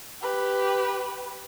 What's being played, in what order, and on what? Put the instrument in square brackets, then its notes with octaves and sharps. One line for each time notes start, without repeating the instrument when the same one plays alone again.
[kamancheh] G4 B4